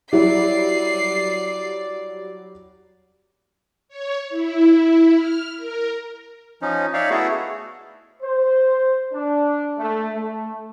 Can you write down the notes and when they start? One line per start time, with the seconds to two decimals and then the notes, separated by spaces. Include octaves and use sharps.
0.13 F#3 G3 E4 D5 C7
3.88 C#5
4.29 E4
5.16 F6
5.57 A#4
6.62 F3 C#4 D#4
6.94 D#4 C#5 D5 E5 F5
7.10 A3 B3 E4 F#4 G#4 A4
8.22 C5
9.13 D4
9.79 A3
10.16 A3